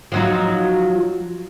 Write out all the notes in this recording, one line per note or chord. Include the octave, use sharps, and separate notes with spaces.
F3 F#3 D#4